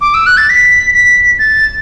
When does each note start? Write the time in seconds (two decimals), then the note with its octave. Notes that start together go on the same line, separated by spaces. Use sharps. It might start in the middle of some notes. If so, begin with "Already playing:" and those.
0.01 D6
0.14 E6
0.26 F#6
0.37 A6
0.49 B6
0.93 B6
1.38 A6